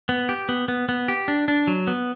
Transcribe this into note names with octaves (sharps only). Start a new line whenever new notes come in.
B3
G4
B3
B3
B3
G4
D4
D4
F#3
B3